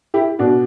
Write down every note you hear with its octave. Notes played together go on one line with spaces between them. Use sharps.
E4 G4
B2 D4 F#4